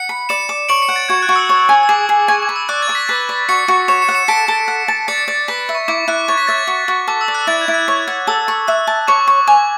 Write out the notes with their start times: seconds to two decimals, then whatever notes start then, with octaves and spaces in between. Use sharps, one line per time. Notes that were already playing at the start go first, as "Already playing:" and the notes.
Already playing: F#5 C#7
0.09 B5
0.29 D5 C#7 E7
0.49 D6
0.69 C#5 D7 F#7
0.82 C#7 E7
0.88 F#5
0.96 A6
1.09 F#4 G#6
1.22 F#6
1.29 F#4
1.36 E6
1.49 C#5
1.69 G#5
1.83 E6
1.89 G#4 D6
2.09 G#4
2.28 G#5 C#6
2.43 D6
2.49 B5
2.56 E6
2.69 D5 F#6
2.82 A6
2.89 D6
2.95 B6
3.09 B4 B6
3.29 D5
3.49 F#4 A6 C#7
3.68 F#4
3.88 C#5 C#7 E7
4.02 C#7 E7
4.09 F#5
4.15 C#7 E7
4.28 A4 B6 D7
4.48 A4
4.68 F#5
4.88 A5
5.08 D5 A6 C#7
5.28 D5
5.48 B4 B6
5.69 E5
5.75 C#6
5.88 E4 D6
6.08 E4 F#6
6.28 C#5 A6
6.38 B6
6.47 E5 A6
6.58 A6
6.67 F#4
6.88 F#4
7.08 A4 D6
7.21 E6
7.28 D5
7.35 F#6
7.47 E4 A6
7.61 G#6
7.68 E4
7.74 F#6
7.88 C#5
8.07 F#5
8.27 A4 E6
8.48 C#6
8.68 E5 F#6
8.87 A5
9.07 C#5 D6
9.27 C#6
9.47 G#5 D6